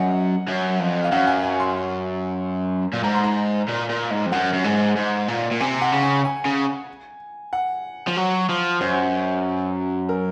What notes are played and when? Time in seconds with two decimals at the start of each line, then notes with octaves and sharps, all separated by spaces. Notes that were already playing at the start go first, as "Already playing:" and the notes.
Already playing: F#2 D#5 F#5
0.47 F#2
0.79 F2
1.04 F5
1.12 F#2 F#5
1.27 G#5
1.43 G#5
1.60 C6
2.93 A#2
3.04 G#2 A#5
3.15 C6
3.24 A#5
3.68 A#2
3.89 A#2
4.11 G#2
4.26 F2
4.32 F#2 F#5
4.53 F#2
4.64 G#2
4.96 G#2
5.28 A#2
5.51 A#2
5.60 C3 G#5
5.82 F#5
5.92 C#3
6.03 G#5
6.25 G#5
6.46 C#3
7.53 F#5
8.07 F3
8.16 F#3
8.49 F3
8.81 F#2 C5
10.09 A#4